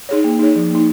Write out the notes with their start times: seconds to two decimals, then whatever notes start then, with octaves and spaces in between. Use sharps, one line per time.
0.09 D#4 G#4 C#5
0.24 A#3
0.39 D#4 G#4 C#5
0.56 F3
0.70 A#3 D#4